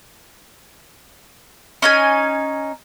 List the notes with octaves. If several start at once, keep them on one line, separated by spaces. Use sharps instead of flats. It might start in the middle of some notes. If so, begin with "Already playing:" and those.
C#4 D#4 G#5